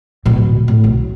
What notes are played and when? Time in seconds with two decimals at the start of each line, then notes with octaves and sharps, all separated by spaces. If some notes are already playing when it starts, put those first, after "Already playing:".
0.25 D1 B2
0.68 A2
0.84 B1